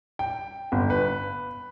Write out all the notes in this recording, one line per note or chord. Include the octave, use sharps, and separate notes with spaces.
G5
G1
B4